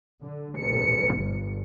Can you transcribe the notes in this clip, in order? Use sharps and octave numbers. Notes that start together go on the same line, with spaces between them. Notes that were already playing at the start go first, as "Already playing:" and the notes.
D3
C#7
G1